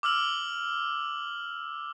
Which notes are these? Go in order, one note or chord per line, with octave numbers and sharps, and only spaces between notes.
D6 E6 F6 F#7